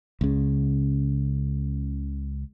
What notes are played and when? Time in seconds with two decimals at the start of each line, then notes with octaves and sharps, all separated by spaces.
0.21 C#2 C#3